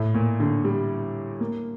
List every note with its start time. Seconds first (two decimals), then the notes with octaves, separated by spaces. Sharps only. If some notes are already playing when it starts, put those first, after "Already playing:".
Already playing: A2
0.14 A#2
0.40 D3
0.64 G3
1.40 A#3